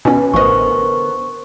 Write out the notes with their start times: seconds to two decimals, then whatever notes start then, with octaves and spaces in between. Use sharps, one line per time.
0.05 B2 C#4 B4 G#5
0.34 A1 D3 B3 A#4 C5 D#5 C#6